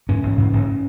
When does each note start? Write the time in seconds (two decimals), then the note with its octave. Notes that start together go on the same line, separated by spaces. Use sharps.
0.09 G#2 C#4
0.23 A1
0.38 G#2
0.53 A1